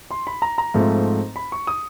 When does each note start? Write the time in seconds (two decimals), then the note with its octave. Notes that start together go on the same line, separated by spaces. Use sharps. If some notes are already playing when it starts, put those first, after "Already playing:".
0.11 C6
0.27 B5
0.42 A#5
0.58 A#5
0.74 G#2 F3 A3 C4
1.36 B5
1.52 C#6
1.67 D#6